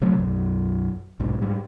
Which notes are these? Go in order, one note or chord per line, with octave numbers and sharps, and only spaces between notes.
C3 F3 F#3 A3
B1 F#2
B1 G#2
G#2 G3